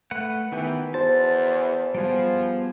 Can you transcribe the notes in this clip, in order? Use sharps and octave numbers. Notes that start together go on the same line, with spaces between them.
A3 B4 F#5
D#3 E3 B3 G4
E2 F#4 C5 A5
F3 G3 B3 G#4